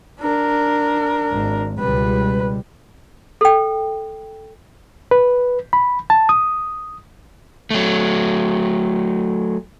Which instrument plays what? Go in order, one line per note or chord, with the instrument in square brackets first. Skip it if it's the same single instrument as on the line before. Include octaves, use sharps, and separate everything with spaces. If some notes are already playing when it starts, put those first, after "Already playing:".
[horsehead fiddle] D4 A#4
[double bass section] G#1
[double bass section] C#2 B2 G3 [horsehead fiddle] B4
[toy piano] A4 G5
[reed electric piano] B4
B5
A5
D#6
[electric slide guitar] F#3 A3